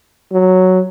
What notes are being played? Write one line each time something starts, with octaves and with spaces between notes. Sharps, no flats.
F#3